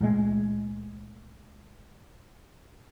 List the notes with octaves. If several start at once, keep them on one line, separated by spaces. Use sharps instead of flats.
C#2 A#2 G#3 A3